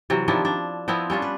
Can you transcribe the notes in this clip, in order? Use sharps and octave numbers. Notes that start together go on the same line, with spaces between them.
C3 E3 F#3
D#3 F3 D4 E4
D4
F3 B3 C4 E4
G3 C#4 D4 F4
B4